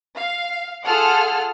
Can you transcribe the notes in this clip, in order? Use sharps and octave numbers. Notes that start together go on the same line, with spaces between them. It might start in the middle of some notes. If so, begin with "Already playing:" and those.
F5
F4 G#4 A4 F#5 F6